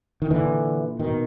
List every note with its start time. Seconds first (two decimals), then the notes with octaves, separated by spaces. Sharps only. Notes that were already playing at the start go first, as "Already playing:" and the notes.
0.22 D#3
0.31 A#2 D3 E3
0.99 B2 D#3